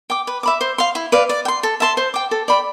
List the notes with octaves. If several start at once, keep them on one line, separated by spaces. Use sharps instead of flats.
G5 D6
B4
E5 B5 D6
C5
F5 C6
E4
B4 D5 F5
D5
G5
C6
A4
E5 A5 C6
C5
G5 D6
A4
D5 G5 B5